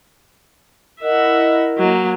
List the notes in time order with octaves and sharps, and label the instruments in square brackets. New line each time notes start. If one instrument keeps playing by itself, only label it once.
[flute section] E4 A#4 D#5 [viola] E5 F#5
[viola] F#3 A#3